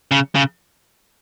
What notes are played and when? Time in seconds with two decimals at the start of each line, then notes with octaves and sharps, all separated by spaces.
0.11 C#3
0.35 C#3